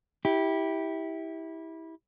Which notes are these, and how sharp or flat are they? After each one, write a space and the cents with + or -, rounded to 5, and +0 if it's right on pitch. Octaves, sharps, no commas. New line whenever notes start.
E4 -20 G4 +0